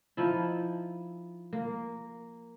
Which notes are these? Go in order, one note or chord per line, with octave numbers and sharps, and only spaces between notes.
F3 D#4 E4
A#3